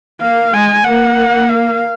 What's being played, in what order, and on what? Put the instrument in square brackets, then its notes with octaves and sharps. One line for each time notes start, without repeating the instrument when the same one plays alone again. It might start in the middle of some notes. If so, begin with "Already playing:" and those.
[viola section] A#3 [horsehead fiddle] F5
[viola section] G#3 [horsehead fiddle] G#5
[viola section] A#3 [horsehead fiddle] F#5
[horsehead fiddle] F5